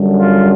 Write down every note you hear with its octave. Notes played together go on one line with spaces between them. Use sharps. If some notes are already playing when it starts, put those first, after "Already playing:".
Already playing: F#2 D3 G3
F4